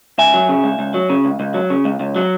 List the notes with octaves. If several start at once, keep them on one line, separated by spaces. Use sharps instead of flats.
C#2 E5 G#5
F#3
C#3
C#2
C#2
F#3
C#3
C#2
C#2
F#3
C#3
C#2
C#2
F#3